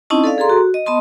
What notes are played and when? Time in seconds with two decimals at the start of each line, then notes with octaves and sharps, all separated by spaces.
0.10 C4 C#4 D#4 E4 D#5 A5
0.24 A4 D5 F5
0.38 G#4 A4 A#5 C6
0.49 F#4
0.74 D#5
0.86 B3 D#5 A5 C6 D#6